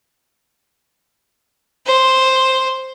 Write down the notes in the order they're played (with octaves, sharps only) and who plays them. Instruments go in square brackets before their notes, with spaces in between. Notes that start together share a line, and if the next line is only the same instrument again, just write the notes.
[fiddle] C5